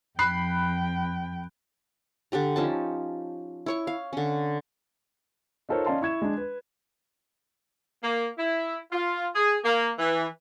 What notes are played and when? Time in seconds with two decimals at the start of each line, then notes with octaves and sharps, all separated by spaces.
0.19 F2 G5 B5 F#6 C7
2.32 D3 D4 G4 A#5
2.56 F3 C#4 D#4 A5
3.66 E4 C#5 C#6
3.87 F5
4.13 D3 C#4
5.69 D#4 F4 A4 A#4 C5 C#5
5.86 C#4 D5 D#5 F5 A5 C6
6.02 E4 C#6 G#6 E7
6.22 G#3 D4
6.37 B4
8.03 A#3
8.38 E4
8.92 F4
9.35 G#4
9.64 A#3
9.99 E3